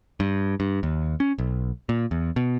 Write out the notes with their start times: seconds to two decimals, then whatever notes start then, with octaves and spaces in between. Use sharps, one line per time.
0.20 G2
0.60 G2
0.83 D#2
1.20 C#4
1.38 B1
1.89 A#2
2.11 E2
2.36 B2